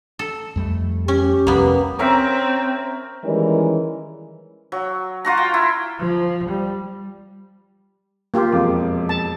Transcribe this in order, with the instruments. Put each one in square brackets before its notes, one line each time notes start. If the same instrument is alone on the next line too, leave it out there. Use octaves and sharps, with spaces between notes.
[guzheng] A4
[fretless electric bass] F2 G3 A3
[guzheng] C#4 [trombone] G4
[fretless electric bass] C2 F2 G3 [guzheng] A#3 B3
[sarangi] C4 [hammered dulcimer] C#4 A#4 E5
[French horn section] D#3 E3 G3 G#3 C#4 A#4
[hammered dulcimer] F#3
F4 F#4 A#5
G5
E4
[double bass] F3
G3
[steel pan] A#3 F4 G4
[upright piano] E1 F2 D6
[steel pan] A5